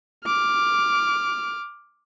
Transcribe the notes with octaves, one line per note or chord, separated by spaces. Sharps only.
D6 F6